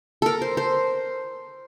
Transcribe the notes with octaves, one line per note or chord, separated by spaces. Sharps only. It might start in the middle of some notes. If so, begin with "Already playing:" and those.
A4 A#4
C5
C5